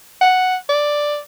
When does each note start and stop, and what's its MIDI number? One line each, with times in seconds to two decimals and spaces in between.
0.21 0.56 78
0.69 1.19 74